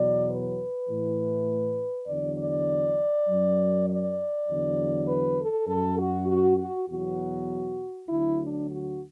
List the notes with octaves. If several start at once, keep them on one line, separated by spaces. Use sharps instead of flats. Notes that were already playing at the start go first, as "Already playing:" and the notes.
Already playing: E2 B2 F#3 D5
B4
A2 E3
E2 D3 F#3 D5
D5
F#2 F#3
D5
E2 D3 F#3
B4
A4
F#2 F#3 A4
F#4
F#4
F#4
E2 B2 F#3 F#4
D2 D3 F#3 E4
D4
F#4